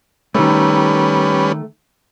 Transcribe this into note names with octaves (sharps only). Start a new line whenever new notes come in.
D#3 G3 A3 C#4 B4